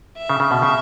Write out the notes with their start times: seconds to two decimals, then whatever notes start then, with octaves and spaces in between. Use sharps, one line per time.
0.18 E5
0.30 C#3
0.40 C#3
0.51 B2
0.62 C#3